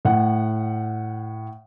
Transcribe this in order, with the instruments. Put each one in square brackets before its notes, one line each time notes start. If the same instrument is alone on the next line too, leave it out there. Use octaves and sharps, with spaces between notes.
[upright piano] A2 F#5